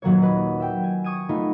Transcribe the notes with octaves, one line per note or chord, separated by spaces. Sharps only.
D#1 F#3 A#3 C#5
B4 D#5
E5 G5
G#5
C#6 D#6 G#6 D#7
A3 B3 D#4 F4